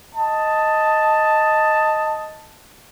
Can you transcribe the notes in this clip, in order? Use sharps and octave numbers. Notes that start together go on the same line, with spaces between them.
D#5 A5